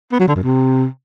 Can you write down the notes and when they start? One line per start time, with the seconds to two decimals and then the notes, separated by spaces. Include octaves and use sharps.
0.12 B3
0.20 F#3
0.27 D3
0.35 F#2
0.43 C3